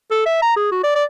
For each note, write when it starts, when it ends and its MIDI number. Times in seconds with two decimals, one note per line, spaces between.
0.11 0.21 69
0.26 0.42 76
0.42 0.53 82
0.57 0.71 68
0.72 0.82 66
0.84 0.95 74
0.95 1.05 74